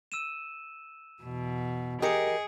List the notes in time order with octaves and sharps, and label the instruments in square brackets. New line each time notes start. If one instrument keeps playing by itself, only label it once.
[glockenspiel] E6 D#7 E7
[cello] E2 B2
[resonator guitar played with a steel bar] G4 A#4 [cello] G#4 [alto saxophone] D#5 [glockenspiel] D#6 C#7 D7